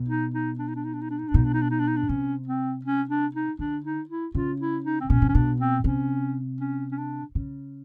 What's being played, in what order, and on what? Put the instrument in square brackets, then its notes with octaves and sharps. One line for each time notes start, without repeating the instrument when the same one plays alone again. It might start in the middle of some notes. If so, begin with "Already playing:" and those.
Already playing: [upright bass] B2
[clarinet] D#4
D#4
D4
D#4
D4
D#4
D4
D#4
D4
D#4
D4
[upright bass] B2 [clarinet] D#4
[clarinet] D4
D#4
D4
D#4
D4
D#4
D4
[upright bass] C3 [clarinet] C#4
[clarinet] C4
C#4
D4
D#4
[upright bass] D3 [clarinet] D4
[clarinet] D#4
E4
[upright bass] C#3 [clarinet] F4
[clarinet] E4
D#4
C4
[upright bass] B2 [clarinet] C#4
[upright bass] C3
[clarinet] C#4
[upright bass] B2 [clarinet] D4
[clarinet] C4
[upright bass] C3 [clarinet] C#4
[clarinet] C#4
C#4
D4
[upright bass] C#3